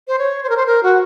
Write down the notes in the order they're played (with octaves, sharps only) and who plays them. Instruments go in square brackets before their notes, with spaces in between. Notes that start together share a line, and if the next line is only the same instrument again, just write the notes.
[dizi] C5
C#5
C5
A#4
C5
A#4
F#4